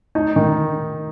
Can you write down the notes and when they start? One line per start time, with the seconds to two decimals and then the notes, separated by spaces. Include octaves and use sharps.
0.15 D#4
0.36 D#3